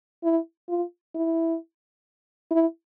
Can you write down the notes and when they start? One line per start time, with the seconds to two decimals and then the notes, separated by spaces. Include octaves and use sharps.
0.24 E4
0.69 F4
1.15 E4
2.51 E4